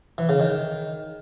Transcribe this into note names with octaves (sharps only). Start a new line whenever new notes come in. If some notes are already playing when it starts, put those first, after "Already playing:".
E3
C#3
D#3